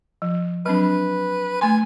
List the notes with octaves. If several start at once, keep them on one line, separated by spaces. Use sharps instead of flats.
F3
F#3 C4 D4 B4
A3 G#5 C6